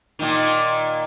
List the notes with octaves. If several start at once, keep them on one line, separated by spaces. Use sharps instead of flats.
A#2 D#3